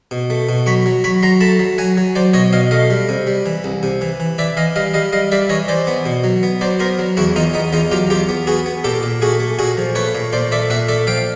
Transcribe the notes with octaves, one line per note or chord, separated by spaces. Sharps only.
B2
A3
B2
F#3 B5 C#6
F#3
F#3 B5 C#6
F#3 A#5 C6
A3 A5 B5
F#3
F#3 F#5 G#5
F#3
F#3 C5 D5
B2 C#5 D#5
B2 D#5 F5
A3 D#5 F5
G3
C3
G3
E3
C2
C3
E3
E3
E3 D5 E5
E3 D#5 F5
G3 D#5 F5
G3 D#5 F5
G3 D#5 F5
G3 D5 E5
E3 C#5 D#5
E3 C5 D5
B3
B2
F#3
B3
F#3 C5 D5
B3 A#4 C5
F#3
E2 E4 F#4
E2 D#4 F4
B3 D#4
E2 D#4 F4
F#3 F4 G4
E2 F4 G4
B3
B3 F#4 G#4
B3
A#2 G4 A4
A#2
A3 F#4 G#4
A3
A#2 F#4 G#4
F3
A3 B4 C#5
A#2
A#2 C5 D5
A3 D5 E5
A#2 E5 F#5
A3 D5 E5
F3 F5 G5